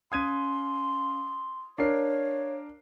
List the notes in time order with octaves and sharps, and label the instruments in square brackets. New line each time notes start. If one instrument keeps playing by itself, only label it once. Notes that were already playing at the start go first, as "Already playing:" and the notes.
[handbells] C#4 F5 [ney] C6 [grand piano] D#6 G#6 D#7
[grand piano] D4 A#4 C7 [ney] C#5 [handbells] F5